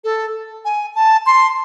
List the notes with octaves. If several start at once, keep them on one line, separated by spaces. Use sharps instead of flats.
A4
G#5
A5
C6